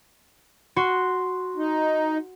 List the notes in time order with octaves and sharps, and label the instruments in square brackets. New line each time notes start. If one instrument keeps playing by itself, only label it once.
[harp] F#4 C6
[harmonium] D#4